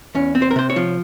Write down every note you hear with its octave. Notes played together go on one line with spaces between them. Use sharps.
E2 C#4
C4
C5
A#4
C3 C5
C#5
F3